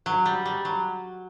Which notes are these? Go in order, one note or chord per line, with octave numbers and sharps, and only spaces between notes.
F#3
G3
G3
F#3